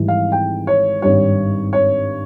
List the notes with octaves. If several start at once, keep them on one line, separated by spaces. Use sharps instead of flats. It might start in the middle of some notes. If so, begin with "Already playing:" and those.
Already playing: G#1 G#2 E3 G3
F5
G5
C#5
G#1 G2 G3 C#5
C#5